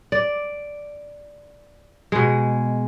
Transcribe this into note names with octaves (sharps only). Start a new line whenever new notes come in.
D5
B2 G#3